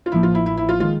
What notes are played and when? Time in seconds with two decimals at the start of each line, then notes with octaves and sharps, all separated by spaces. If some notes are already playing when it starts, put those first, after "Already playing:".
0.06 F4
0.12 A1 A2 F3 A#3 E4
0.23 F4
0.35 E4
0.46 E4
0.57 E4
0.69 F4
0.80 D#3 G#3 F4